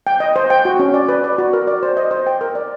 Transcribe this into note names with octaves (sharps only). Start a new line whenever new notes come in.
G5
D#5
C5
G5
F#4
C#4
D5
B4
D5
F#4
A#4
D5
C5
D#5
C5
G5
A#4
D5